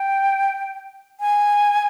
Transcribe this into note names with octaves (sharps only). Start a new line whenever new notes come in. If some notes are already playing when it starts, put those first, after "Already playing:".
Already playing: G5
G#5